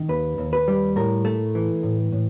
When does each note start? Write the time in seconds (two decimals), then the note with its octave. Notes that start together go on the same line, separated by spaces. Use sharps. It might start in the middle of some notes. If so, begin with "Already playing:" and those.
Already playing: D#3
0.09 D#2 B4
0.38 D#2
0.53 B4
0.68 G3
0.96 A2 A#4
1.25 A3
1.55 E3
1.83 A2
2.12 A2